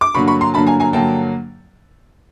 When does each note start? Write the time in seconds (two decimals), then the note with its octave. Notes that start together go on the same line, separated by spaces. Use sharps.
0.01 D6
0.14 G2 D3 F#3 A#3 D4 B5 C#6
0.27 B5 C#6
0.41 A#5 C6
0.54 G2 D3 F#3 A#3 D4 A5 B5
0.67 G#5 A#5
0.80 G#5 A#5
0.93 G2 D3 F#3 A#3 D4 G5 A5